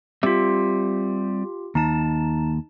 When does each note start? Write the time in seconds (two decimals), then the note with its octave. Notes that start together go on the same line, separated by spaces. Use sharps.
0.23 G3 C4 F4 G4 E5
1.75 D#2 D#4 A5